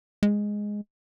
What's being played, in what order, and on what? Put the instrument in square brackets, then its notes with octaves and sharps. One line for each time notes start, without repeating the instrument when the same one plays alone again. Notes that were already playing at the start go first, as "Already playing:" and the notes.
[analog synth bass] G#3